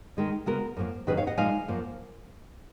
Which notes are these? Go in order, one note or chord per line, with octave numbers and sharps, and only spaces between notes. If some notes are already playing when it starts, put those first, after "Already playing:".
D#3 G#3 D#4
C#3 G#3 B3 F#4 A#4
F#2 F3 A#3
F#2 D#3 F#3 C#4 G#4 B4
C#5 F5
D#5 F#5
A#2 F3 G#3 D#4 F5 G#5
F#2 F3 A#3